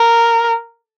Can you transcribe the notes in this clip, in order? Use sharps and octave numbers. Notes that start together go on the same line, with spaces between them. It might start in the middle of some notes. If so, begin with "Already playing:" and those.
Already playing: A#4